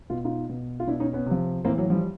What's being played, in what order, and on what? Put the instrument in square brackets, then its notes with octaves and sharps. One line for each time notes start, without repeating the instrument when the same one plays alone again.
[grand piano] B2 F4
D#4 F4
B2
F4
B2 D4 E4
C#4 D#4
B3 C#4
C3 F3
A2 E3 A#3 C4
F#3
F3 G3